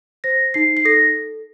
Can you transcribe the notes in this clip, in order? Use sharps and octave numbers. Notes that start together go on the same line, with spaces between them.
C5 A#6
D#4 C7
C7
A4 A#6